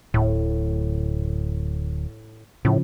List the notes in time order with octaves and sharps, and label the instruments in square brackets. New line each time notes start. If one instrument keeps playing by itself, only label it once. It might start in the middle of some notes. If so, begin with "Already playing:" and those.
[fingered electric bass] D1 [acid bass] A2
[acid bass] A2 [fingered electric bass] C#3 F3